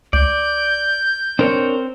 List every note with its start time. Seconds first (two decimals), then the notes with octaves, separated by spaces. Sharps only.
0.13 C#2 D5 G6
1.39 C4 D4 A#4 C5 C#5